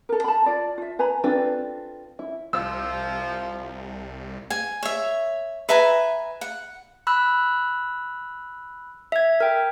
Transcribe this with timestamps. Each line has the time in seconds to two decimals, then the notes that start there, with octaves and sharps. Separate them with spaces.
0.09 A4 A#4
0.24 A5 B5
0.46 F4 D5
0.78 F4 E5
0.99 B4 G#5 A#5 B5
1.24 C4 D4 F4 A4 B4
2.19 E4
2.53 C2 F3 E6
4.50 G#5
4.83 C#5 E5
5.69 B4 E5 G#5 A#5
6.41 F#5
7.07 B5 E6 F#6
9.12 E5 G#6
9.40 A#4 G5